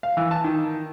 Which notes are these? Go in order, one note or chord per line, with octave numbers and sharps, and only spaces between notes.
F5
E3
A5
D#3